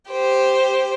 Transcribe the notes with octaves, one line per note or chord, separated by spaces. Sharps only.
G4 C5